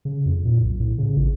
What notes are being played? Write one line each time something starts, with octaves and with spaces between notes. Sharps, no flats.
C#3
F2
A#2
B1
A2
C#3
A1